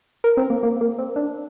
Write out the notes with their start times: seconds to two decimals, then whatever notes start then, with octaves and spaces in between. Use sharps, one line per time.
0.24 A#4
0.37 C4
0.50 A#3
0.63 A#3
0.81 A#3
0.98 C4
1.16 D4